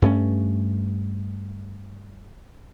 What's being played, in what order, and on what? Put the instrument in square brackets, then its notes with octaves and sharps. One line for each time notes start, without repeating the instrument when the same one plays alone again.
[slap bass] G2 A3 C#4